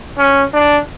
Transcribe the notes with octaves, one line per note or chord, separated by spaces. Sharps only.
C#4
D4